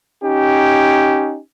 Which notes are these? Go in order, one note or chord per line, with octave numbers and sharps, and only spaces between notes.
C#4 D#4 G4